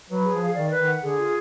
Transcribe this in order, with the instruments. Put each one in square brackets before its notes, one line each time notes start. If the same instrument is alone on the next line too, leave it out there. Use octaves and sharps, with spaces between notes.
[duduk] F#3 [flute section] B4
[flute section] G#4
[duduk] F3
[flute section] F5
[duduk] D#3 [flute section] D5
[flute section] B4
[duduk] D#3
[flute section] F#5
[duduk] D3 [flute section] G#4
[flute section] F4